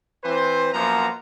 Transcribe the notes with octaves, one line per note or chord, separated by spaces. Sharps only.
E3 C4 B4 C5
F#2 F3 A#3 B3 C5 A#5